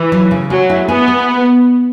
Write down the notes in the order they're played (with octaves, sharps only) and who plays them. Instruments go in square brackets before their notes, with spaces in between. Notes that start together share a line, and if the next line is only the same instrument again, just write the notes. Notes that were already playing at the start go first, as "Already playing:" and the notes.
Already playing: [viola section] E3
[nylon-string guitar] F#3
C#3
[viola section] F#3 [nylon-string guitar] G#4
[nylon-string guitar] E4
[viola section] B3 [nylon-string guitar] G#4
[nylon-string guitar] G#4